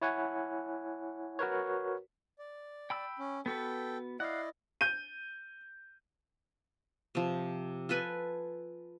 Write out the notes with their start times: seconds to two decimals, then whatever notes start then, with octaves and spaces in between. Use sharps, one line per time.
0.02 E4 C#5 F#5 G#5
1.39 F#4 A#4 B4 C#5
2.39 D5
2.90 G5 B5 E6
3.19 C#4
3.46 B3 F#4 A4 B4 G5
4.20 E4 D5 D#5 F5 F#5
4.81 G6 D#7
7.15 C3 F3
7.89 F4 A4 B4 G#5